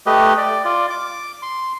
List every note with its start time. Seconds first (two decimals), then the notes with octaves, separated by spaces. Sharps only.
0.06 A3 G4 B4 D#5
0.38 D5
0.65 F4 D5
0.90 D6
1.42 C6